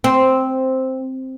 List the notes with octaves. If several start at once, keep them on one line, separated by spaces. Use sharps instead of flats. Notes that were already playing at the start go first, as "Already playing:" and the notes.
C4